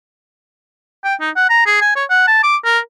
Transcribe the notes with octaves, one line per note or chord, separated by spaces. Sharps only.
G5
D#4
F#5
A#5
G#4
G#5
C#5
F#5
A5
D6
A#4